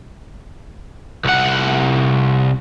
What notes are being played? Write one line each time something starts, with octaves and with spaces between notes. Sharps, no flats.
C2 F#5